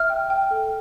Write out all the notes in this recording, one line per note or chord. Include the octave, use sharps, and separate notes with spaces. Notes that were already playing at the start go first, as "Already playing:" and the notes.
Already playing: E5 F6
G5
G5
A4